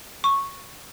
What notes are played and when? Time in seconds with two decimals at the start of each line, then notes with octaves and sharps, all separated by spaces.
0.24 C#6